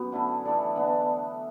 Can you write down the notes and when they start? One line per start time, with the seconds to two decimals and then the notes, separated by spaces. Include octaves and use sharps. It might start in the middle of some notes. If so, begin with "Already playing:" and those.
Already playing: F#2 B3
0.12 D3 A3 E4
0.45 E3 A3 D4 A4
0.76 D3 B3 D4